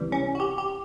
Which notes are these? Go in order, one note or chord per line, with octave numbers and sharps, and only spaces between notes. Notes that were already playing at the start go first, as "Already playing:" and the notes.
Already playing: C#2 C3 E3 G3
C#4
F#4
G4
G4